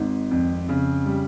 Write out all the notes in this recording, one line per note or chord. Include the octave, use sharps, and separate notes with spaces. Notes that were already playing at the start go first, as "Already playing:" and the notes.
Already playing: G#1 G#2
F2
C#3
G3